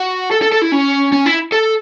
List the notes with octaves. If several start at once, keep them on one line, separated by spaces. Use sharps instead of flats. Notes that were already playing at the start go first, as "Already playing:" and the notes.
Already playing: F#4
A4
A4
A4
E4
C#4
C#4
E4
A4